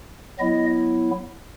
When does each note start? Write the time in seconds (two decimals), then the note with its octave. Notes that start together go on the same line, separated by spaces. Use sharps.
0.39 F#3 B3 E4 D#5